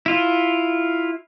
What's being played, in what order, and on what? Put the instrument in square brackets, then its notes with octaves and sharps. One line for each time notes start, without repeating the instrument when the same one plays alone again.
[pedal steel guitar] E4 F4